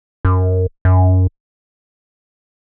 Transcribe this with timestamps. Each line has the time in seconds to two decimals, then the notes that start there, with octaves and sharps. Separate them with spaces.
0.25 F#2
0.85 F#2